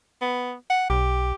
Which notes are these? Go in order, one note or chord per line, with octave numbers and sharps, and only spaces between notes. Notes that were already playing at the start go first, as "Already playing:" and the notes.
B3
F#5
B1 G4